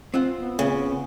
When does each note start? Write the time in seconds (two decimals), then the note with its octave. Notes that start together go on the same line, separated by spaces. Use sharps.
0.14 C4 F4 F#5
0.34 B3
0.59 C#3